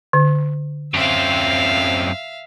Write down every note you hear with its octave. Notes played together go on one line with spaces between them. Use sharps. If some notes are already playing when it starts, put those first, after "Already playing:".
D3
F#2 C4 E5 F5